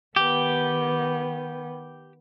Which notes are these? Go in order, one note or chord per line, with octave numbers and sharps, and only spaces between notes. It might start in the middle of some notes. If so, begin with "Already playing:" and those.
D#3 B3 G4